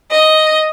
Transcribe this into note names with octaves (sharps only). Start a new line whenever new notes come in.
D#5